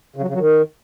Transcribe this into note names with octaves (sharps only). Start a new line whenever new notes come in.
C#3
F#3
C#3
F#3
D#3